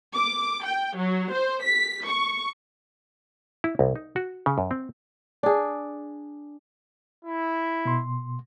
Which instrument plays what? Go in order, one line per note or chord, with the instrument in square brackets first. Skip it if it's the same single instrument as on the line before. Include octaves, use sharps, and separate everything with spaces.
[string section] D6
G5
F#3
C5
B6
C#6
[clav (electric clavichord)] E4
C2
D#4
F#4
C#3
F#2
C4
[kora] D4 G#4
[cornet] E4
[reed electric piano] B2 C6